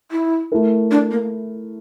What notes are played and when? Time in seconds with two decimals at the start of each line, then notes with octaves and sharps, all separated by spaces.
0.12 E4
0.52 A3 E4 A#4
0.91 D4
1.11 A#3